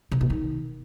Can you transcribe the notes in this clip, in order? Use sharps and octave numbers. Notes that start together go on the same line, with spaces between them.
C3
B2
D#3